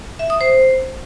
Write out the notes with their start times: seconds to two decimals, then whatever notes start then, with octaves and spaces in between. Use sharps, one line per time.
0.19 E5
0.30 D#6
0.41 C5